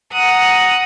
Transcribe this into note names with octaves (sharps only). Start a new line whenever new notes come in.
F#5 A#5 D#6 F#6